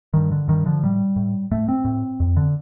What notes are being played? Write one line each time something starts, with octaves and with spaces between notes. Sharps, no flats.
G2 D#3
D3
G2 D#3
D3 F3
A2 G3
A2
A2 A3
C4
A2
F2
D3